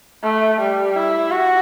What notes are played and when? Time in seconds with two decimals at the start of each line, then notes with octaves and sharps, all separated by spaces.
0.23 A3
0.60 G3
0.96 E4
1.31 F#4